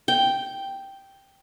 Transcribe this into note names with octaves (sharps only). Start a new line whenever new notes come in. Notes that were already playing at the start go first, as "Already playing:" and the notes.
G5